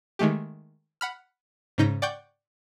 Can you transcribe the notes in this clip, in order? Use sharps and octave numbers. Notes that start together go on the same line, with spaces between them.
D#3 G#3 A3 G4
F#5 B5 F6
G#2 C#3 D#4 G6 A#6
D5 F#5 G5 C#6 G6